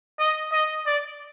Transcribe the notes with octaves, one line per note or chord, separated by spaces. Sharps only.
D#5
D#5
D5